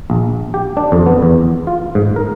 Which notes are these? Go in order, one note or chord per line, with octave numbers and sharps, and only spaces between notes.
A#1
G4
D4
F2
B3
E2
F4
G#2
A#4